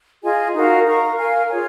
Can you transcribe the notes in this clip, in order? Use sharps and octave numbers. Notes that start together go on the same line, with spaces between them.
F4 G#4 D#5 G#5
D#4 F#4 A#4 F5
A#4 F5 A#5 C#6
A#4 F5 G#5
F4 G#4 C#5 G#5